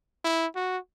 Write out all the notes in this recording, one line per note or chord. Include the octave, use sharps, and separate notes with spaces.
E4
F#4